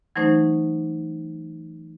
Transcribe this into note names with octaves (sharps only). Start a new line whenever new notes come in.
E3 F#3 A3 C#4 D#4 C5